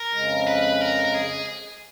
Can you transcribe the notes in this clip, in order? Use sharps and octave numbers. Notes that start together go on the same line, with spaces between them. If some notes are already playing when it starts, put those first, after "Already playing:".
Already playing: A#4
F2 C#3 G#3
B4
A#4
A#4
G#4